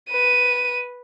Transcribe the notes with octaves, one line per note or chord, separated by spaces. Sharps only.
B4 D#7